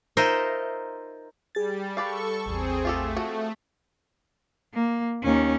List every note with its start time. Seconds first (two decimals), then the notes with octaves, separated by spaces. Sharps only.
0.17 D#4 F4 A#4 C5 D#5 E5
1.55 G3 G#4 A6
1.97 A4 B4 D5 F5 C#6
2.46 A1 E2 C4 G#4
2.85 A3 F4 G4 A4
3.17 F3 F#4
4.74 A#3
5.23 D#2 C#4